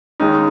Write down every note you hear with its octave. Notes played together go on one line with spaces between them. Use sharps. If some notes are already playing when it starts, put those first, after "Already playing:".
D#2 D#3 G#3 C#4 D#4